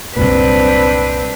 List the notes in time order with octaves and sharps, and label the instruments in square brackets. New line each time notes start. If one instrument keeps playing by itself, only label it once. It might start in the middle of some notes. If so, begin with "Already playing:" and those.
[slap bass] C2 F#2 A#2 [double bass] C4 [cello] D4 B4